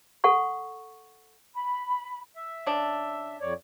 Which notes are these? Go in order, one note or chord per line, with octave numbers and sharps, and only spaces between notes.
A4 F#5 C#6
B5
E5
C#3 D4
F2 C#5 D5